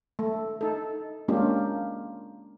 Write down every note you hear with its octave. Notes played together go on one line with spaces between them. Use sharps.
A3
D#4 A4
G#3 A#3 C#4 D4 F4 G4